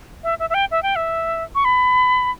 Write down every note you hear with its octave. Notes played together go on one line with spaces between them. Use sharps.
E5
E5
E5
G5
E5
G5
E5
C#6
B5